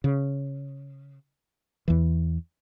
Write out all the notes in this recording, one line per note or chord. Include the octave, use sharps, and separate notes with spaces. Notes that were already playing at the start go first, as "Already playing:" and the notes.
C#3
E2 E3